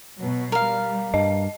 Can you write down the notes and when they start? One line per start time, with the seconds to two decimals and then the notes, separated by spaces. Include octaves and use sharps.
0.18 B2 F#3
0.52 G3 A#4 F5
1.14 G2 D#5